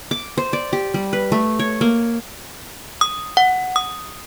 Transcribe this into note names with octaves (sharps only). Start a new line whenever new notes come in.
D6
C5
D5
G4
G3
B4
A3
C#5
A#3
D#6
F#5
D#6